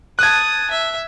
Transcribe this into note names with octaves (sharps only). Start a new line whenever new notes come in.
A5 D#6 F#6 G#6
E5